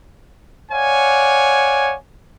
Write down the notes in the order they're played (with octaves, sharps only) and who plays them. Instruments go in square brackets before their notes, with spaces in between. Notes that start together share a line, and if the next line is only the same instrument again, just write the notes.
[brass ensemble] C#5 D5 F5 F#5 G#5